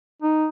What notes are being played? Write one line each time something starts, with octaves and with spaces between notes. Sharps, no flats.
D#4